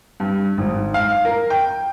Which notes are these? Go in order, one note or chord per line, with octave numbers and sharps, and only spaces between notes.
G2
G#1
F5
A#4
G5